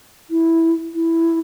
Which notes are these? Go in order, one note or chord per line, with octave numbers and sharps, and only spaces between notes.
E4
E4